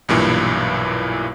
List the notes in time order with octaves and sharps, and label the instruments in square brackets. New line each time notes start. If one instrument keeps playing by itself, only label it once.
[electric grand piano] B1 G2 A#2 E3